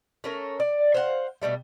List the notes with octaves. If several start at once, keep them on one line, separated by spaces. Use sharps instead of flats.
A3 C#4 A#4
D5
C5 F5 F#5
B2 D#3 G3 A3